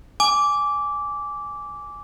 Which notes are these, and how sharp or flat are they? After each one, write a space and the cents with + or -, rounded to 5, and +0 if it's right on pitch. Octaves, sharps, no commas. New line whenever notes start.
G#5 +0 D6 -15